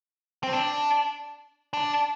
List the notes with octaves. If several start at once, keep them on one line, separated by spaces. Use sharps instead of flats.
C4
D4
D4